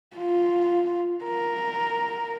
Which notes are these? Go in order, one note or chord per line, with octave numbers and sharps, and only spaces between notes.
F4
A#4